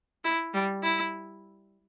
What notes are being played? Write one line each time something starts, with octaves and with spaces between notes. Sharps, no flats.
E4
G3
E4